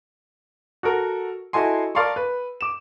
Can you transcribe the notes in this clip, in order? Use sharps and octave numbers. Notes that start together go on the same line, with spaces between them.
F#4 A4 A#4
E4 F#4 A4 D#5 G#5 C6
A#4 D5 F5 A5 C6 C#6
B4
D6 E7